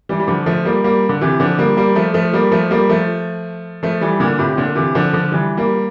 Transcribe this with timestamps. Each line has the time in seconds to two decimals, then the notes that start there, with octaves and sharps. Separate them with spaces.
0.09 E3 G3
0.20 G3
0.28 D3 F3
0.46 F3 A3
0.65 G3 A#3
0.84 G3 A#3
1.09 D3
1.21 C3 E3
1.40 D3 F3
1.59 G3 A#3
1.77 G3 A#3
1.96 F3 A3
2.14 F3 A3
2.33 G3 A#3
2.52 F3 A3
2.71 G3 A#3
2.89 F3 A3
3.83 F3 A3
4.01 E3 G3
4.20 A#2 D3
4.39 A2 C3
4.57 A#2 D3
4.76 C3 E3
4.95 D3 F3
5.13 D3 F3
5.32 E3 G3
5.57 G3 A#3